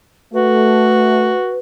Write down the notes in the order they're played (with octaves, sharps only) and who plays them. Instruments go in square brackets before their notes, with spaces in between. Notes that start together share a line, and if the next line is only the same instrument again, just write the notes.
[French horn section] A3 [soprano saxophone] F#4 [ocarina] B4